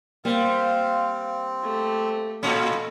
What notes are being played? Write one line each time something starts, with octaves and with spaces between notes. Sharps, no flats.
G3 A#3 C4 C5 F5
A3 G4
A2 C#4 F4 A4 D#5 B5